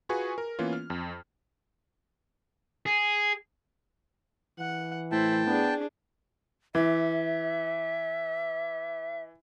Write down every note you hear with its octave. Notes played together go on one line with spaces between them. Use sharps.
F4 F#4 G#4 B4 G#5 C#6
A#4
E3 A#3 B3 C#4 F4
F6
F2
G#4
E3 F#5
A2 E4 C5 G5 A5
B3 D4 G#4
E3 E5